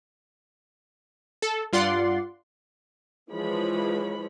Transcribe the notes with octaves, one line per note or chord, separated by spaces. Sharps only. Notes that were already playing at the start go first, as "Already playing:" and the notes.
A4
G2 F4 D5 F#5 C6
E3 F3 G#3 C#5 B5